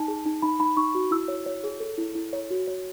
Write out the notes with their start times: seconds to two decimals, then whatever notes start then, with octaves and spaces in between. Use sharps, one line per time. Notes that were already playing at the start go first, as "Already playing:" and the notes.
Already playing: D#4 A5
0.08 G#4
0.26 D#4
0.42 D#4 B5
0.59 D#4 B5
0.77 D#4 C#6
0.95 F#4
1.11 E4 E6
1.28 C#5
1.46 C#5
1.64 G#4
1.80 A4
1.98 E4
2.15 E4
2.33 C#5
2.50 F#4
2.67 C#5